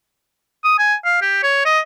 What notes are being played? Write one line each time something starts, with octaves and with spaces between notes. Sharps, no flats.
D#6
G#5
F5
G4
C#5
D#5